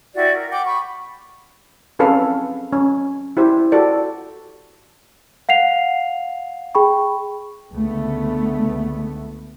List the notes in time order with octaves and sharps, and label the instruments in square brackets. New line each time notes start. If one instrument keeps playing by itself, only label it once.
[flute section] E4 F#4 G4 D5
A#4
F#5 G5 D6
B5 C#6
[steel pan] C4 C#4 G#4 A4 B4 F5
C#4
E4 G4 C5
F#4 G4 A4 D5
[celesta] F5 F#5 C7 F7
G#4 G5 B5 C#6
[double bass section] C#2 D3 A3 B3